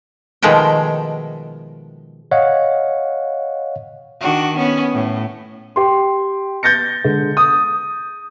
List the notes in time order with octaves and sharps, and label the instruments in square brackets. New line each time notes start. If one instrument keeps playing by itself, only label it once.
[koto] B2 D#3 F3 G#3 A3 G5
[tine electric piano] C#5 D#5 F5 F#5
[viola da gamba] D#3 D4 F#4
B3 C#4
A2
[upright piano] G4 C6
G6 A6 A#6 C#7
D3 G#3
D#6